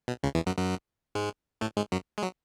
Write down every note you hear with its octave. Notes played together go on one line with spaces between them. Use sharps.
B2
C#2 C#3
E2 E3
F#2 F#3
F#2 F#3
G#2 G#3
A2 A3
G#2 G#3
F#2 F#3
G#3
F#3